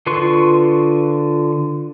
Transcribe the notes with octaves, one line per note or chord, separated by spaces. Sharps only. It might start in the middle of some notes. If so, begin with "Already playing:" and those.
D3 F4 B4 C6 C#6